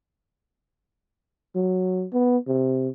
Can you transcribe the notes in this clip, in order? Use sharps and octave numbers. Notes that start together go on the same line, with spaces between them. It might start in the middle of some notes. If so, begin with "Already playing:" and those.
F#3
B3
C3